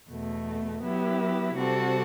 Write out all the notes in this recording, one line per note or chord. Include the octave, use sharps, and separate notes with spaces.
E2 B2 A3
F#3 B3 E4 G4
C3 G3 C4 F#4 A4